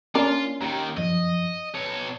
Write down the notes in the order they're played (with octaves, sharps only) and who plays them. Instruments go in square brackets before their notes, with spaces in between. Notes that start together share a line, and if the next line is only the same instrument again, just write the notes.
[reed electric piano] A#3 [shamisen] C#4 D4 A#4 [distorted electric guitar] F4
[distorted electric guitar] D#2 D#3 [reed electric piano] G4 A#5
[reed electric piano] F#2 F3 [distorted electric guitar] D#5
[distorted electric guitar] B2 C#5 [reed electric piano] A5